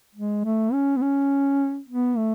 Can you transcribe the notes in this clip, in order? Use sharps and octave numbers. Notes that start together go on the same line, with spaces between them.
G#3
A3
C#4
B3
C#4
B3
A3